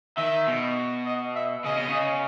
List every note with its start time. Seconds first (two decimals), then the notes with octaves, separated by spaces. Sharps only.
0.17 D#3 E5
0.47 B2
1.06 D#5
1.35 E5
1.64 C#3 D#5
1.77 B2
1.88 C#3